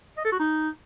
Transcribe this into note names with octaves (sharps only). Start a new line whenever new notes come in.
D#5
A4
F#4
D#4